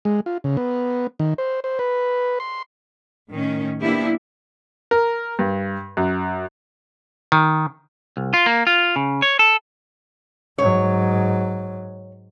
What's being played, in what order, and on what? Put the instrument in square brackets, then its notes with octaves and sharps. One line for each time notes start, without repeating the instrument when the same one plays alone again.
[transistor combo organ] G#3
F4
C#3
B3
D#3
C5
C5
B4
C6
[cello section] A2 D#3 C#4
F3 A#3 B3 D4 E4 G4
[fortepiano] A#4
G2
F#2
[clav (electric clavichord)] D#3
[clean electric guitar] C2
F4
A#3
F4
C#3
C#5
A4
[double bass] G#2 F#3 [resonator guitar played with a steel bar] C#5